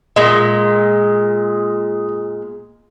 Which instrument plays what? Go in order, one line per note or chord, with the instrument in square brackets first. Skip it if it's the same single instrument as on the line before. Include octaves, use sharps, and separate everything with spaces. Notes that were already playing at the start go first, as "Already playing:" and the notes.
[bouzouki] A#2 G#3 [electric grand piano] D#5